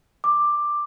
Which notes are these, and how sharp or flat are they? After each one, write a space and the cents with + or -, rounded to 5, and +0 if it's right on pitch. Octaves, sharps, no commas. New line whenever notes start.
D6 +10